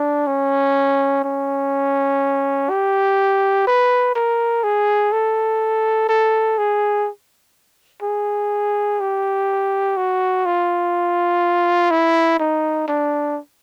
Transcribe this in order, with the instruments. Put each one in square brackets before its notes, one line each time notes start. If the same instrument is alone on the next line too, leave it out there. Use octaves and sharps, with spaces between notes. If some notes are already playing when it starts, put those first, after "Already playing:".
Already playing: [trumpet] D4
C#4
C#4
G4
B4
A#4
G#4
A4
A4
G#4
G#4
G4
F#4
F4
E4
D#4
D4